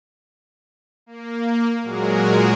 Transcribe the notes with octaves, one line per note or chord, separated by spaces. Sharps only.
A#3
A#2 F#3 G#3 F#4 G#4 A#4